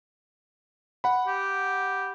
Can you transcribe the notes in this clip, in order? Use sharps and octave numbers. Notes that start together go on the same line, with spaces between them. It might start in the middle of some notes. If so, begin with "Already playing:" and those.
F#5 B5
G4